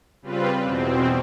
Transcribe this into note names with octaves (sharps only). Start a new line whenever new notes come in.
C#3 G3 C4 F4 B4
E2 B2 C4